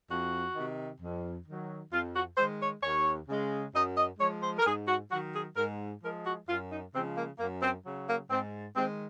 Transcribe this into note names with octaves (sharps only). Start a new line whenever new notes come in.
F2 F#4
C3 D#3
F2
D#3 F#3
F2 F4
F#4
D#3 G#3 C5
C#5
D#2 C#5
C#3 G#3
F#2 D#5
D#5
F3 G#3 C#5
C5
A#4
G#2 G#4
F#4
D#3 F#3 F#4
G#4
G#2 A#4
F3 G#3 A#4
F#4
F#2 F4
D#4
C#3 F3 G#3 C4
A#3
F#2 A#3
C4
C#3 F#3
A#3
G#2 C4
D#3 G#3 C4